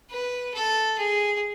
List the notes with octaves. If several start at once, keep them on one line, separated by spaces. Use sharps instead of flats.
B4
A4
G#4